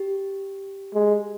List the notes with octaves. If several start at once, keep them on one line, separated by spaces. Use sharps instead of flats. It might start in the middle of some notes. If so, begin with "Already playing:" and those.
Already playing: G4
G#3